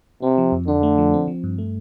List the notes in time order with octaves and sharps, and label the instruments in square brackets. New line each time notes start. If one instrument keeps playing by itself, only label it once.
[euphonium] C3 [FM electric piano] C4
[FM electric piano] F3
F2
[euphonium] D3 [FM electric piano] D4
[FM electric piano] A3
F3
C4
F3
G2
A3